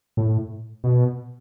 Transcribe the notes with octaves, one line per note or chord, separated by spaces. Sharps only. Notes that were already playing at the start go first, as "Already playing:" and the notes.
A2
B2